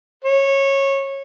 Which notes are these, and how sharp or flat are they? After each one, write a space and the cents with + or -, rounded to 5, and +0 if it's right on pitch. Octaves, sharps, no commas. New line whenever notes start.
C#5 -20